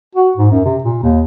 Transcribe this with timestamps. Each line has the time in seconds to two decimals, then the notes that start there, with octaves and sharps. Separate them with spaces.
0.15 F#4
0.37 G#2
0.51 F#2
0.65 C3
0.84 A#2
1.03 D#2